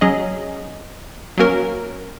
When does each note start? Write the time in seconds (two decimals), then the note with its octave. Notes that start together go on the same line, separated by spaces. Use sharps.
0.01 F#3 C#4 G#4 D#5
1.38 F#3 A#3 C#4 F#4 A#4